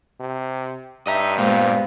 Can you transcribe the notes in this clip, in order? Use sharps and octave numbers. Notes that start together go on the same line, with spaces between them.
C3
G2 D#5 E5 A#5
A#2 G#3 B3 C5 F5